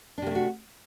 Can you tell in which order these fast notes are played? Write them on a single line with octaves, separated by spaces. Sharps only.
D4 C3 A#3 A3 F#4